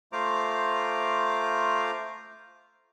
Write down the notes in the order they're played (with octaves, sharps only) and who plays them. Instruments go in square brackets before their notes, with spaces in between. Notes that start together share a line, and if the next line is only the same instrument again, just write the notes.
[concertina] A3 F4 C5 A#5 D6